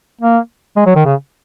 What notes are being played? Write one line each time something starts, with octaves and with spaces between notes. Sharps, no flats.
A#3
G#3
F#3
D#3
C#3